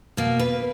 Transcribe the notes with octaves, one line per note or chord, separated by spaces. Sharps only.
B2 A#3
B4